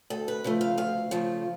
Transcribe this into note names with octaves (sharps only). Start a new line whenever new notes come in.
D2 A4
B4
C#3 F3 A3
F5
D2 F5
C#3 F3 A3